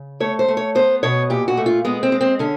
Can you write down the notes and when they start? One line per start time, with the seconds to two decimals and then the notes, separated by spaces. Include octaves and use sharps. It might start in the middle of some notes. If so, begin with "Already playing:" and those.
Already playing: C#3
0.20 A3 C#5
0.39 C5
0.48 A3
0.57 C#5
0.75 B3 C5
1.03 B2 C#5
1.30 A#2 G4
1.48 F#4
1.57 A3
1.66 F4
1.85 G#3 B3
2.03 C4
2.12 G#3
2.21 C4
2.39 D3 C#4